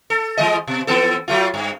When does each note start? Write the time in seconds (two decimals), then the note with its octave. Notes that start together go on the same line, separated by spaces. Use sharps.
0.10 A4
0.37 E3 G#3 D#5
0.67 B2
0.87 E3 B3 A4
1.28 F#3 A3 F4
1.54 G2